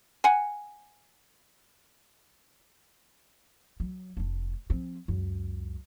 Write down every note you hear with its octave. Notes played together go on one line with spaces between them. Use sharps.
F#5 G#5
F#3
F1 D4
F3 C4
C#2 F#2